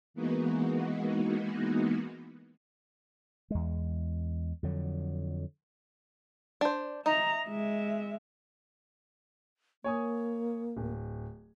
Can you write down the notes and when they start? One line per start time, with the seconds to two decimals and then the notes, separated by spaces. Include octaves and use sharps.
0.14 E3 G#3 A#3 B3 D#4 F#4
3.50 E2 G#3
4.63 F2 D3 F#3
6.61 D4 C5
7.06 D#4 E5 A#5
7.48 G#3 E5
9.84 A#3 C#5 G#5 D#6
10.77 D1